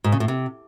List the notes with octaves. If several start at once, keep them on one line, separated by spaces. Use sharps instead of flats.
G#2
C#3
A2
C3